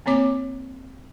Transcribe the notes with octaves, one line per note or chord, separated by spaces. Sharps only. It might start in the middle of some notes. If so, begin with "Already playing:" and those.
A#3 C4 C#5 D6